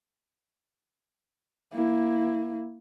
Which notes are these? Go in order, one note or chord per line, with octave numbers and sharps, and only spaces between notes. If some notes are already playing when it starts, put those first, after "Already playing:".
A#3 E4